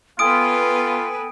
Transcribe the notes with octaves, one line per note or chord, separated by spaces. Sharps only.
B3 F4 A4 B4 G5 G#5 D#6 D7